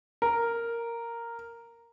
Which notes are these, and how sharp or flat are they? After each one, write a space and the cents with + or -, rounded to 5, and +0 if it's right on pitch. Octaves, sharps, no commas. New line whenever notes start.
A#4 -5